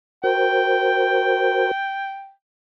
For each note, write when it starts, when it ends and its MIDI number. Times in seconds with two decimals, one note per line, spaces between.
0.24 1.71 66
0.24 1.71 70
0.24 1.71 72
0.24 2.31 79